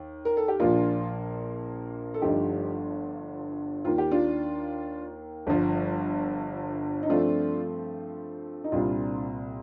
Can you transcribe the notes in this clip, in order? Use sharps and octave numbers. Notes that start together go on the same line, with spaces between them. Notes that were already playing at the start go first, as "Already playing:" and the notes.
Already playing: D#2
A#4
A4
G4
A#1 A#2 F3 A#3 D4 F4
A4
G1 G2 F3 A3 D#4 G4
D#2 D#3 A#3 F4
G4
D4 F4
G1 G2 F3
D#4
G2 F3 A3 C4 D4 F4
D#4
C2 A#2 G3 C4 D4 F4